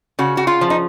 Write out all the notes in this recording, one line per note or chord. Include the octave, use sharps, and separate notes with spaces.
C#3 F#4
F#4
F4
F3
D#4